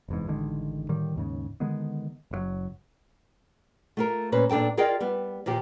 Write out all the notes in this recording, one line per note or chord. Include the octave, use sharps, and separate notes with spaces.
F1 E2 G#2
A1 D3 D#3 G#3
A2 D3 D#3 G3
D#2 G#2 C#3
D3 D#3 G#3 B3
F#1 B2 F#3
A3 F4 A#4
A#2 C#4 B4 C5
A#2 D4 A4 G5 A5
F4 G#4 A#4 D5 D#5 G5
G3 B3
D#2 A#2 F3 G4